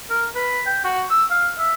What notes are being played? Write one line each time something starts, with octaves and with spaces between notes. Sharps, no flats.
A#4
B4
G5
F#4
E6
F5
E5